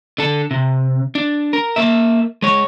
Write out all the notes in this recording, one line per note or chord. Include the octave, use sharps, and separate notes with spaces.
D3 A4
C3
D4
A#4
A#3 E5
G#3 C#5